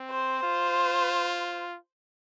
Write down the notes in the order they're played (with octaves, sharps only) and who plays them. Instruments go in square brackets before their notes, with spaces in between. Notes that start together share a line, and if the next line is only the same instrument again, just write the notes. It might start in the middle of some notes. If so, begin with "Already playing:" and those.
Already playing: [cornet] C4
[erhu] C5
[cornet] F4